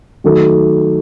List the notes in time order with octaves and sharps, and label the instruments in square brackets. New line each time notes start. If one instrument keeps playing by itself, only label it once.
[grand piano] D#3 F#3 A3